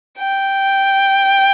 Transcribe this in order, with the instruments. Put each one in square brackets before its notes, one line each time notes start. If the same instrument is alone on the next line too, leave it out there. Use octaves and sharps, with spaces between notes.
[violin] G5